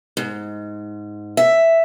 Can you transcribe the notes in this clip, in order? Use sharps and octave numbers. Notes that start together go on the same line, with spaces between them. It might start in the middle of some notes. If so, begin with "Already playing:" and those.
G#2
E5